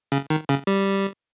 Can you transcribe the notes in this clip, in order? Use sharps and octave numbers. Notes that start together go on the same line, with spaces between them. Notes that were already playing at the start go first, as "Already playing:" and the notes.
C#3
D#3
C#3
G3